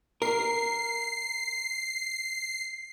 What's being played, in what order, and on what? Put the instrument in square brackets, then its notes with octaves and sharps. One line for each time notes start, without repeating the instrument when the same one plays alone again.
[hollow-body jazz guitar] A#4 [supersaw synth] C7